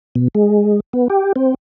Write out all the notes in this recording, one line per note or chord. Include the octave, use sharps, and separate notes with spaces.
B2
G#3
B3
G4
C4